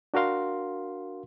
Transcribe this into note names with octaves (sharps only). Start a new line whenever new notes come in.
D4 F#4 A#4 F5 C6